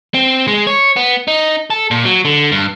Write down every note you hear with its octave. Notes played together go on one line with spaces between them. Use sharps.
C4
G#3
C#5
B3
D#4
A4
A#2
F#3
D3
G2